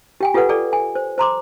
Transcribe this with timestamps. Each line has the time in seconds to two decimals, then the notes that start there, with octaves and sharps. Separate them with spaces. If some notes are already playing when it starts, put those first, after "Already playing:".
0.21 G4 G5 G#5
0.34 F4 G4 A4 B4 F#5
0.49 G#4 A4 D5
0.73 G#5
0.95 C5
1.18 C5 A#5 C6 D6